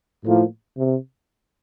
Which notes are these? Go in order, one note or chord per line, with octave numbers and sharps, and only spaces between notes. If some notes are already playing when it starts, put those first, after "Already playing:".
A2 F3 A#3
C3